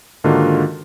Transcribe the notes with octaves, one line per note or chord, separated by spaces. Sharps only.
G#2 D3 D#3 A#3 F4 F#4